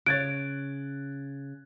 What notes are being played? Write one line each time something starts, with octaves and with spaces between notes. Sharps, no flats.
C#3 C#5 F#6 G#6 A6 D7